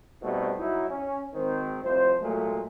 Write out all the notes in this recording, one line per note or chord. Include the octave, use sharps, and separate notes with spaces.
B2 G3 A3 C4 D#4 A4
F#3 D#4 E4
C#4
G#1 D#3 C4
C2 F2 A2 C5
A#2 F#3 G#3 A3